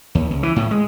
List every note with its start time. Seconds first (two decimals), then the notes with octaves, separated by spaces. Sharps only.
0.15 D#2
0.31 C#2
0.43 E3
0.56 A2
0.71 G#3